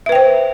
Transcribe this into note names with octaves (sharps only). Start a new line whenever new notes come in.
B4 C5 E5 G5